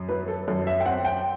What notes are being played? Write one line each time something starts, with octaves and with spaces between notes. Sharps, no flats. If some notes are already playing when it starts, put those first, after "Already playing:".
Already playing: F#2
F#3 B4
A4
F#2 A4
E5
G5
C4 F#5
G5